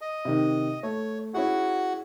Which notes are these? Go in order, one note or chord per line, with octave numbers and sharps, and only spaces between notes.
D#5
C3 D#3
A3 C#5
C#4 E4 F#4 G#4 F#5